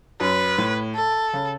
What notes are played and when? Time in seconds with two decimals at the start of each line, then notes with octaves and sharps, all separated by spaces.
0.20 F#2 B4
0.58 A2
0.95 A4
1.33 C#3